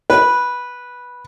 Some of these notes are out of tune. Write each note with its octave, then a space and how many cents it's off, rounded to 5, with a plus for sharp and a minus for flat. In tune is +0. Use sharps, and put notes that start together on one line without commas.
B4 -10